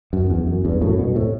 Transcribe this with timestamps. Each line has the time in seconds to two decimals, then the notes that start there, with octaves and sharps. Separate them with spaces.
0.13 F#2
0.30 E2
0.47 F#2
0.65 E2 G2
0.82 F#2 A2
0.98 G2 B2
1.15 A2 C3